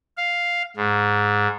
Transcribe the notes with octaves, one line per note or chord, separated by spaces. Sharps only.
F5
G#2